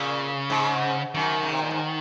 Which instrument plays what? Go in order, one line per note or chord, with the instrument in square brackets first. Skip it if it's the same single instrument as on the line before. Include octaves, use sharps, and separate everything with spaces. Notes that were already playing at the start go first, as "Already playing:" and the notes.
Already playing: [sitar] A#2 [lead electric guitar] C#3
[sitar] G#2
[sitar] F#2 [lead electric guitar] D#3
[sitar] C#3
C3
A#2
G#2